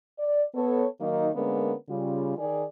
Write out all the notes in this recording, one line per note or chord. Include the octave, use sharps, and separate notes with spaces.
D5
B3 A4 C#5
D#3 F#3 A#3 D#4
D3 G#3 A#3 B3 C#4 A#4
C#3 G3 F4
D#3 G#4 D5